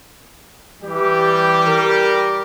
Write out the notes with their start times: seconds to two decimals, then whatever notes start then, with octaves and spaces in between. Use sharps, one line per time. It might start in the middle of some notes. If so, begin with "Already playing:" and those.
0.83 E3 G3 G4
1.66 A#4